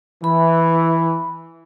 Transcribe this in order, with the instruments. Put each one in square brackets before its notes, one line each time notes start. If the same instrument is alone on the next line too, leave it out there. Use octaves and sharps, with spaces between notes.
[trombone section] E3 [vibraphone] B5